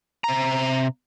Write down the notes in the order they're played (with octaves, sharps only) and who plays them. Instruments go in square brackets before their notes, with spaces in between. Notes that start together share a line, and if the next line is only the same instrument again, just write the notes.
[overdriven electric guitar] C3 A#5